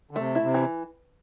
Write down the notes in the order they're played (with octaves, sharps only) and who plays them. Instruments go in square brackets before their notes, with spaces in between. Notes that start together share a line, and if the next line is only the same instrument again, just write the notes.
[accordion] D3
[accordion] C3 [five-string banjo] A3
[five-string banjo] E4
[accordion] C3
[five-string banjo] E3